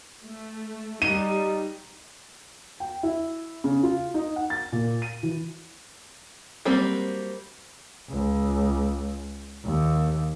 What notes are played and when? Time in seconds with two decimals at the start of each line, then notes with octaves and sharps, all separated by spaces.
0.24 A3
1.02 G3 D#4 D#7
2.80 G5
3.03 E4
3.64 C#3
3.83 F4
4.14 D#4
4.36 F#5
4.50 A6
4.72 A#2
5.02 D#7
5.23 E3
6.65 F#3 G3 A#3 C4
8.09 C#2
9.64 D#2